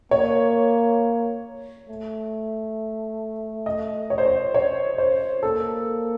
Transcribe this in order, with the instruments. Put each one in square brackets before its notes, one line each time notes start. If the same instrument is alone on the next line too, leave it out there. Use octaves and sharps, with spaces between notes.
[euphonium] A#3 [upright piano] C#5
[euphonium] A3
[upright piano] D#5
C#5
C5
C#5
C#5
C5
[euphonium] A#3 [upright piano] A4